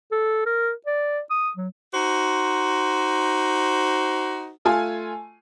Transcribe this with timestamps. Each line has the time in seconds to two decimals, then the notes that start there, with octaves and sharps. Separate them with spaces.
0.12 A4
0.46 A#4
0.87 D5
1.30 D#6
1.57 F#3
1.94 D#4 F#4 C5
4.65 A3 F4 G#5